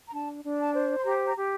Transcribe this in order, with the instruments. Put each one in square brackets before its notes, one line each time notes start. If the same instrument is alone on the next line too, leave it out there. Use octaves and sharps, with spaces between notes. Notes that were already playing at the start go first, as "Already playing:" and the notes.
[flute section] A#5
D4 A5
D4
A5
C5
C6
G4 A#5
A#5
G4